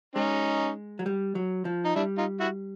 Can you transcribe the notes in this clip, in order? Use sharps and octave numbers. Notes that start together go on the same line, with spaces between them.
G#3 C#4 D#4
F#3
G3
F#3
F3
D#4
G3 D4 E4
D#4 F4
E4 F#4